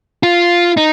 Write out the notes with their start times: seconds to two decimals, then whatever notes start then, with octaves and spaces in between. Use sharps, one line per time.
0.23 F4
0.77 D#4